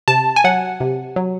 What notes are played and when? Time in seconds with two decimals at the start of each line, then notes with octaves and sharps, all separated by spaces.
0.08 C3 A5
0.36 G#5
0.44 F#3 F#5
0.80 C3
1.16 F#3